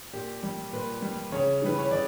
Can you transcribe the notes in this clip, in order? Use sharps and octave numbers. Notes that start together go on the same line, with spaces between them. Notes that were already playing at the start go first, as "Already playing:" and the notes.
A#2 G4
G3
A#2 B4
G3
C#3 C#5
E3 G3 B4
C#5
C#3 D5